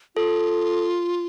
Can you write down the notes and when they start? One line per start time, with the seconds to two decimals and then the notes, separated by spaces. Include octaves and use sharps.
0.16 F4 A4